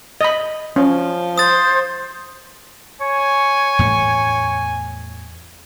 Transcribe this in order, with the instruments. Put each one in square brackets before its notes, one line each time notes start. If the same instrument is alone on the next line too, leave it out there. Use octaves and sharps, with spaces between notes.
[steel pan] D#5 B5
[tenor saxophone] F3 [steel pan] C#4
[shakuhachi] C5 [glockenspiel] D#6 A6
[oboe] C#5 [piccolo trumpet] G#5
[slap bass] E2 A2 A3